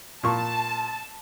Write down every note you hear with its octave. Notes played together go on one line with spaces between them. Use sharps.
A#2 A5 C#6